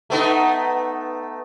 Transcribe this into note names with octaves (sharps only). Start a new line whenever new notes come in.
A3 B3 D#4